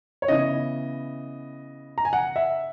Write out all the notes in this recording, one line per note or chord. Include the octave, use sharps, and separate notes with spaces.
C#5
C#3 E3 B3 D#5
A#5
G#5
F#5
E5